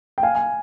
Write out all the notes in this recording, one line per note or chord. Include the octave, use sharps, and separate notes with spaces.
G5
F5 G#5
F5 G#5